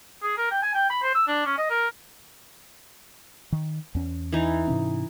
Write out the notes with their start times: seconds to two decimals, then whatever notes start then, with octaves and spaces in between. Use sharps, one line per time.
0.23 G#4
0.37 A#4
0.51 G5
0.63 G#5
0.74 G5
0.90 B5
1.02 C5
1.15 E6
1.28 D4
1.46 C#4
1.58 D#5
1.70 A#4
3.52 D#3
3.95 E2 C#4
4.32 E3 D#4
4.67 G#2 C3 C#4